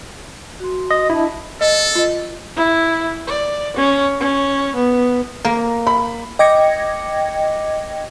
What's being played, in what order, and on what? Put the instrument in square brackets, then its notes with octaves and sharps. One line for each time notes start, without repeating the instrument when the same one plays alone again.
[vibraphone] F#4 C6
[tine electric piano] D#5
[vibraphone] D4 D#5 A5 [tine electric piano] E4
[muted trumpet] A4 [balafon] D#5
[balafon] F4 D#5
[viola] E4
D5
C#4
C#4
B3
[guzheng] A#3 [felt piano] A#5
[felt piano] B5
[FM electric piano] D#5 G5 D6 G#6 A#6 C#7